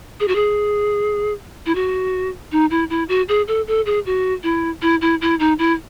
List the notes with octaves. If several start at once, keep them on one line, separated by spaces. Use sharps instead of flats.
G#4
F#4
G#4
E4
F#4
D#4
E4
E4
F#4
G#4
A4
A4
G#4
F#4
E4
E4
E4
E4
D#4
E4